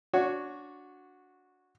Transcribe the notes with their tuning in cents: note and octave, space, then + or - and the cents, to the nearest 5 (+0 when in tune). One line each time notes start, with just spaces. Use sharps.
D4 -15 F#4 -10 C#5 +0